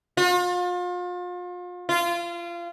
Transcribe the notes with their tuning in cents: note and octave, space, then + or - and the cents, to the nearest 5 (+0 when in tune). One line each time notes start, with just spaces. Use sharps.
F4 +35
F4 -25